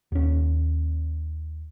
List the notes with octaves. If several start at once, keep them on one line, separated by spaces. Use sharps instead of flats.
D#2 C#4